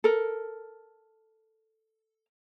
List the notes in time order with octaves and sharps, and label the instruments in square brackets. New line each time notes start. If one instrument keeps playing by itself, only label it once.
[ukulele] A4 A#4